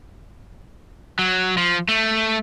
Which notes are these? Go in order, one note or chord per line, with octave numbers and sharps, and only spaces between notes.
F#3
F3
A3